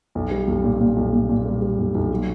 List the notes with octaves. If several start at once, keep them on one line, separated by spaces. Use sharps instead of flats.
B1
G3
B1
A#2
A#2
B1
A#2
A#2
G3
G3
B1
B1
F#3